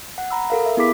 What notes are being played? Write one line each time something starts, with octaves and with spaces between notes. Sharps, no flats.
F#5
A#5 B5 E6
A4 A#4 F5
E5
B3 E4 G#4 B5 D6 B6